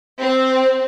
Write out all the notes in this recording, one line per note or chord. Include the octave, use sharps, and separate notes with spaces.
C4